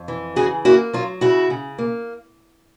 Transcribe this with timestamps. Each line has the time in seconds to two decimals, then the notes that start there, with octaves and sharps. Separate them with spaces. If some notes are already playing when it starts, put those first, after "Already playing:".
Already playing: F2
0.08 E3
0.36 C#3 F#4 G#4
0.65 A#3 E4 F#4
0.93 F#3 F4
1.21 C#3 E4 F#4
1.50 C#3
1.78 A#3